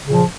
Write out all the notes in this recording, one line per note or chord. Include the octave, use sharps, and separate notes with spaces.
A#2 C#3 F3